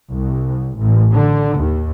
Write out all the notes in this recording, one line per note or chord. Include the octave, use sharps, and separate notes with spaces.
C2
A1
D3
D#2